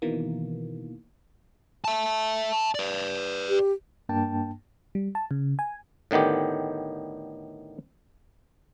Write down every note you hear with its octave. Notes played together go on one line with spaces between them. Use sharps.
B2 D#3 E3 A#3
E5 A5
B4 D5
G4
G2 A#3 D4 G5 A5
G3
A5
C#3
G#5
A2 D3 D#3 B3 G4